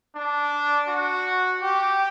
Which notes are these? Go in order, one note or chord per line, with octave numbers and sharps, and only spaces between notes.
D4
F#4
G4